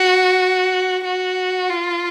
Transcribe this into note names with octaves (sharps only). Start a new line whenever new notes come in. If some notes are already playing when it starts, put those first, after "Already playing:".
Already playing: F#4
F#4
F4